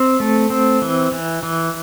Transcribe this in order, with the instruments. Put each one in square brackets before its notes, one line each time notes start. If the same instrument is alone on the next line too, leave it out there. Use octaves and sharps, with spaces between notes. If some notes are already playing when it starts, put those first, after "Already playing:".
Already playing: [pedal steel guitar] C4
A3
C4
E3
E3
E3